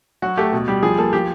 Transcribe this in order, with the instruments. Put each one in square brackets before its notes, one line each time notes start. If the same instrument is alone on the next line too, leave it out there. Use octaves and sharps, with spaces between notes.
[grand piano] F#3 F#4
A3 G4
B2
G3 G4
F3 G#4
A#3 A4
F3 G4